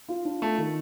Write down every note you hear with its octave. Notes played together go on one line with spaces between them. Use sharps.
F4
D4
A3 F4
D#3